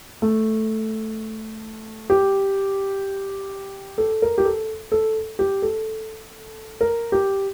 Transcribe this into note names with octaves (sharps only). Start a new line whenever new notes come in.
A3
G4
A4
A#4
G4
A4
A4
G4
A4
A#4
G4